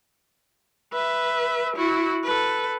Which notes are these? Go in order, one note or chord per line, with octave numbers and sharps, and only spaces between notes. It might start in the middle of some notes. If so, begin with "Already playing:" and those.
B4 E5
E4 F#4
A4 B4